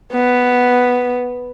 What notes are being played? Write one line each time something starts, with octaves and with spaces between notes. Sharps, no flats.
B3